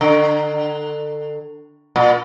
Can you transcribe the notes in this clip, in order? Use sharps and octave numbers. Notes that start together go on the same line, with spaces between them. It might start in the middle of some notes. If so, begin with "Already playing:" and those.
D3
A#2